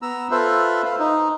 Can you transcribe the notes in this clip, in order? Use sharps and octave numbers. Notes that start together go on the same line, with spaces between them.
B3 A#5 E6
F4 A4 B4 C5 E5
B4 C5 F5
D#4